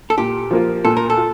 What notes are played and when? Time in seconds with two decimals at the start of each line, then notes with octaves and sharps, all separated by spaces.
0.10 A4
0.18 A#2 G4
0.51 F3 A#3 F4
0.85 A#2 A4
0.97 A#4
1.10 A4
1.18 F4